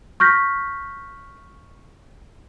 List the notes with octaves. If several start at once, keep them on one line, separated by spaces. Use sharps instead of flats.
C#6 F6 G6 A#6 B6